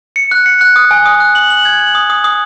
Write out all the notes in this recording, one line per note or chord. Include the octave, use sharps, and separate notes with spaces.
C#7
F#6
C#7
F#6
D#6
G#5
D#6
F#6
F#7
F#7
G#6
F#7
D#6
D#6
D#6